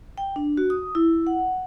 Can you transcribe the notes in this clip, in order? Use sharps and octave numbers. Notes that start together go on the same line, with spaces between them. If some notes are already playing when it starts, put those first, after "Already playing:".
G5
D4
F#4
D#6
E4
F#5